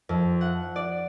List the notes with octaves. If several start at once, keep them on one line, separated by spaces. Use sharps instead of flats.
F2
F#5
D5